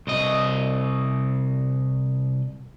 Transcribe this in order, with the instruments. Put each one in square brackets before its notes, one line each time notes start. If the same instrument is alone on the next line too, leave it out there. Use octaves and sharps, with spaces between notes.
[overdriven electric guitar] C2 D#5